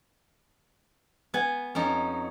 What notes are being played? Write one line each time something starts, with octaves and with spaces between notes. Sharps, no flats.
B3 B4 G#5
F2 C#4 D#4